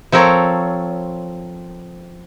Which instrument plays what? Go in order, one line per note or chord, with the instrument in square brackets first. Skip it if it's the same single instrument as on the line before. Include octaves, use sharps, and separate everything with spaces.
[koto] F3 C4 A4 A#4 C#5